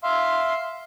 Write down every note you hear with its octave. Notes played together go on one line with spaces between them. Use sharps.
E5 F5 C6